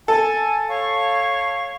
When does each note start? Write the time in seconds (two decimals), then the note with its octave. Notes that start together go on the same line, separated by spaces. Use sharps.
0.08 A4 G#5
0.67 C#5 F5 C#6